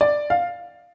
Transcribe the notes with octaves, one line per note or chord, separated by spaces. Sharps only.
D5
F5